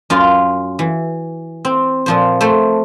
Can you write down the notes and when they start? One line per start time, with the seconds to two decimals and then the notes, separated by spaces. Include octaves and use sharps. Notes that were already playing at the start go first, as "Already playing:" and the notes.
0.10 F#2 F4
0.79 E3
1.65 C4
2.06 A#2 F3 C5
2.41 A3 C5 G5 A5